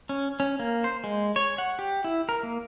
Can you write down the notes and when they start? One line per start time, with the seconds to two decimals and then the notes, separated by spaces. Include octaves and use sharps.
0.09 C#4
0.40 C#4
0.59 A#3
0.84 C5
1.04 G#3
1.36 C#5
1.58 F#5
1.79 G4
2.04 E4
2.29 A#4
2.43 A#3